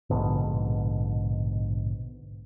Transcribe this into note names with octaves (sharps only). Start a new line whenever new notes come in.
A#1 G#2 B2 D3